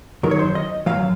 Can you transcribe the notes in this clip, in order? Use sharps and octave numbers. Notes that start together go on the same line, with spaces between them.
F#2 D#3 F#3 A#4
C#5
C5
D#5
F#2 D#3 F#3 F5